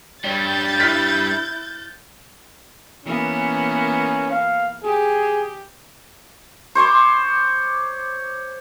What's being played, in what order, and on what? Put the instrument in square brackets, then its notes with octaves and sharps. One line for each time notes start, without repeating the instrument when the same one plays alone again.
[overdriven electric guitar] G2 G3 [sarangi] C#5 [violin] G6 A6
[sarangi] E4 [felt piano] F6 F#6 B6
[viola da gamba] E3 A#3 B3 [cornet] C#4
[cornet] F5
[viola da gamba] G4 [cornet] G#4
[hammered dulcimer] C5 C#5 C6 D6